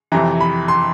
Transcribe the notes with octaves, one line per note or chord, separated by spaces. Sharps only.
F2 C3 E3 A#5
B5
C6